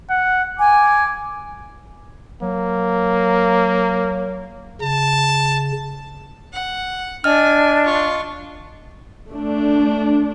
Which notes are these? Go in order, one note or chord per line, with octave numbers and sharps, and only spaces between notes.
F#5
G#5 D6
F#3 A#3
C#3 A5
F#5
D4 D#5 G#5 F6
F4 C#6
A3 D4